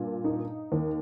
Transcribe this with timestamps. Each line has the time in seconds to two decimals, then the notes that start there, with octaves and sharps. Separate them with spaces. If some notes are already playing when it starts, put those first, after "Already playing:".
Already playing: G2 A#2
0.24 D#4
0.72 D#2